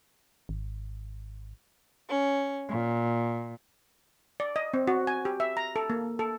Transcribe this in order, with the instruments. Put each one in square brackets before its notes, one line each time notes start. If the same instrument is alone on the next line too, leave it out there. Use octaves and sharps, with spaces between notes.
[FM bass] G#1
[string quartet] C#4
A#2
[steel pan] D5
D#5
C4
F#4
G#5
G4
E5
A#5
A4
A#3
A4